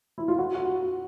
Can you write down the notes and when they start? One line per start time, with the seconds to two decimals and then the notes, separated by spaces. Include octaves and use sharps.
0.18 E4
0.28 F4
0.38 F#4
0.55 F#4